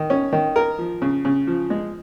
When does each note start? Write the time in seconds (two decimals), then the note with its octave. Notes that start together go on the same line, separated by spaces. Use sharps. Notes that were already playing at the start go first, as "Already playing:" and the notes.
Already playing: D#3
0.10 C#4
0.32 D#3
0.56 A#4
0.79 F3
1.02 C#3
1.25 C#3
1.47 F3
1.70 G#3